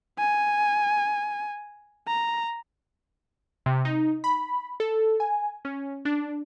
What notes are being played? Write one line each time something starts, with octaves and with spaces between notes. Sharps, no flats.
G#5
A#5
C3
D#4
B5
A4
G#5
C#4
D4